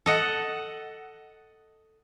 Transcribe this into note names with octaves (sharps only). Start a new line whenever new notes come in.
A4 D#5 F#5